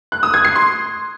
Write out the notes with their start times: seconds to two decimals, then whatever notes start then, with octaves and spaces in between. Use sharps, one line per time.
0.12 F#6
0.23 D#6
0.34 G#6
0.45 C7
0.55 C6